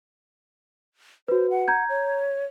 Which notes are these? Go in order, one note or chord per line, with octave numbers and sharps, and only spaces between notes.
F#4 B4 C5
F#5
A#5 G6 G#6
C#5